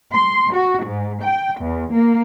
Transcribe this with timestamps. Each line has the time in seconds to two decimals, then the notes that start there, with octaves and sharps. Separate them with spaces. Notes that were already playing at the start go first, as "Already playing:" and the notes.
0.12 C6
0.52 F#4
0.84 G#2
1.23 G5
1.60 E2
1.92 A#3